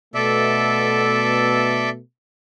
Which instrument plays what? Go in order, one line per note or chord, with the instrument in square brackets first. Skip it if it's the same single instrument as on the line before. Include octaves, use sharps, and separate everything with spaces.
[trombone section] B2 A3 [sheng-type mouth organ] A4 D5 E5